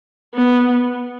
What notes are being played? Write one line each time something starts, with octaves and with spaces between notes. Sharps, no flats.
B3